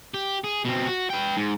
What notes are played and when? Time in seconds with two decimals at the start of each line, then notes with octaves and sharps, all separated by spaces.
0.14 G4
0.44 G#4
0.65 B2 C4
0.87 F#4
1.10 B4 G5
1.37 G#2